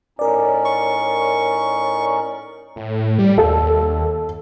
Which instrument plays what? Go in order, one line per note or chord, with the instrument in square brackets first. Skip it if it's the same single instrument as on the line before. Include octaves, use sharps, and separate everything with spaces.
[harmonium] A2 C#4 D#4 [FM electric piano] A#4 D5
[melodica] C#6
[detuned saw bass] A2
G3
[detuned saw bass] D#2 [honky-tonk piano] A4